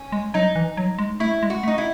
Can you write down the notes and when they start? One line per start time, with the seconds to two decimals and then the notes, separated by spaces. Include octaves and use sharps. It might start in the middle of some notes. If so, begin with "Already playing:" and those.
Already playing: C#4
0.12 G#3
0.34 F#3 D#4
0.56 E3
0.77 F#3
0.99 G#3
1.20 A3 E4
1.43 G#3
1.50 F#4
1.63 A3
1.68 D#4
1.78 E4